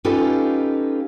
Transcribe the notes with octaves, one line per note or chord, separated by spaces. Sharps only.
C#4 D#4 F4 G4 A4 B4